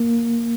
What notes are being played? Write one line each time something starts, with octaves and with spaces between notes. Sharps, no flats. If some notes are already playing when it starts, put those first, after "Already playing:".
Already playing: A#3